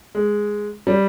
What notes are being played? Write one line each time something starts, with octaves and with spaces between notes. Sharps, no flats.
G#3
G3